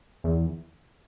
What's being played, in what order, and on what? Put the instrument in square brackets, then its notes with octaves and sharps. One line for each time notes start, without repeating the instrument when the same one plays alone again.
[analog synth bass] E2